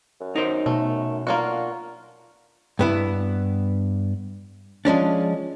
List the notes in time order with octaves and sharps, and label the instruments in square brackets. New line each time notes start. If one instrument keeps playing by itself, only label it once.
[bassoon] F#2
[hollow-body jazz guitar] D#4 A#4 C5
[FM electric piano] B2 [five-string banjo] A3
[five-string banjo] A#3 F4 F#4 [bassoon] D4
[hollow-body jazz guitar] G2 B3 E4
F3 G#3 C#4 D4